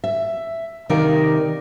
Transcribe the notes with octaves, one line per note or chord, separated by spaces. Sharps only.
E5
C3 D#3 D#4 A#4 D5 F5